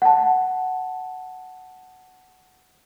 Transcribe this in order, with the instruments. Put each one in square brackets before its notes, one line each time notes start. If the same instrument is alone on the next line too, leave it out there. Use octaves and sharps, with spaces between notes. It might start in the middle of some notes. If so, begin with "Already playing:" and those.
[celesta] F#5 A5